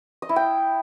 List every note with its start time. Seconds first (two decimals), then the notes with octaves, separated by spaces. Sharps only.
0.22 D#5
0.29 E4
0.36 G5